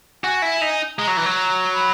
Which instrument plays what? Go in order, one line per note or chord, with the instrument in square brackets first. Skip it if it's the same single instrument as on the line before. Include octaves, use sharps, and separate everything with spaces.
[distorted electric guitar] F#4 [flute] G#5
[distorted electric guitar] E4
D#4
[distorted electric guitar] G#3 [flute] A#5
[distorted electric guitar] F#3
E3
F#3
[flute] A#5
B5